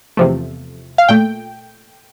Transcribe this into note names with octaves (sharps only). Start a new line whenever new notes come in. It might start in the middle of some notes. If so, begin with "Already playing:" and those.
E2 C3 F3 A3
F5
A#2 A3 G5